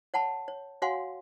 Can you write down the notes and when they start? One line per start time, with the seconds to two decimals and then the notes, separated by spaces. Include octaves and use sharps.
0.14 C#5 F#5 A5 B5
0.48 C#5
0.82 F#4 C#5 F5 F#5 G#5 C6